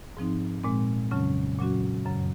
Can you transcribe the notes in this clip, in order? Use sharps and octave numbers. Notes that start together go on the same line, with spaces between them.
G#2 F3 C4 D#4
A#2 G#3 C4
F2 C#3 F#3 C#4
A#2 F#3 C#4 F#4
F#2 C#3 F#3